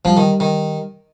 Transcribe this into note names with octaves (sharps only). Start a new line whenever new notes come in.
F3 G3
D#3
D#3